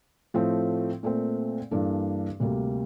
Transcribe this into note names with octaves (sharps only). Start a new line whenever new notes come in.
A2 F3 A3 C4
A#2 A3 C4
G2 E3 A#3 D4 A4
D2 C3 G3 A#3